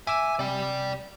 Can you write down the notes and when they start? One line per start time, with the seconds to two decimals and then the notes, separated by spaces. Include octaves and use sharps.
0.07 E5 G#5 D6 E6
0.39 C3 D5 G5